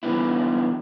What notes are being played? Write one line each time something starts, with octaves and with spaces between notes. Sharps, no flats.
D3 E3 G3 B3 E4